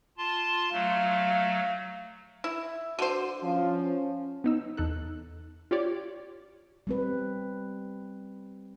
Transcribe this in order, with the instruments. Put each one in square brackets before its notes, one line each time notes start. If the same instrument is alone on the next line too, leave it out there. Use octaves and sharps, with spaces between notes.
[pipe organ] F4 A5 C6
[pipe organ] F#3 A3 [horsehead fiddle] F5
[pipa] E4
[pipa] D3 C5 [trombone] F#4
[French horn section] F3 [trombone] C#4
[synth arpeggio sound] B3 D#4 E6
E2 D#4 A4 F#6
F4 G4 C#5 D5
[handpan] G3 C4 B4